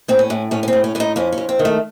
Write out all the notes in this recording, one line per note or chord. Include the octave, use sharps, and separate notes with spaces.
A2 C4
C#4
A2
A2 C#4
C#4
C4
A2
C#4
A2 C#4
D#4
F2 C#4
C#4
F2
C4
D#3
A3